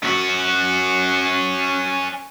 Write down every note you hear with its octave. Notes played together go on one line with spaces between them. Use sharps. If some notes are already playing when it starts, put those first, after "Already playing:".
C#4 F#4